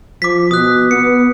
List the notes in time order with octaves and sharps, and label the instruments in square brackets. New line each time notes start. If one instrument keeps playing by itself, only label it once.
[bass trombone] F3 [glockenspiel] D6 B6
[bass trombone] B2 [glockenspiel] D#6 F#6
[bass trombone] B3 [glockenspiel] C#7